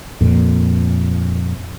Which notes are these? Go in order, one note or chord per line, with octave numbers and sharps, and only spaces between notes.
F2 A#2